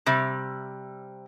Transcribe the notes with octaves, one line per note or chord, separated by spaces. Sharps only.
C3 G3